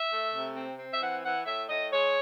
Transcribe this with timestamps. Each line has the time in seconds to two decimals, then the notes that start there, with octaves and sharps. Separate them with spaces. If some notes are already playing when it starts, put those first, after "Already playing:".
Already playing: E5
0.10 A3
0.32 C3
0.54 C4
0.78 C4
0.90 E5
1.00 E3 F#5
1.23 E3 F#5
1.45 A2 E5
1.69 A2 D#5
1.91 G#3 C#5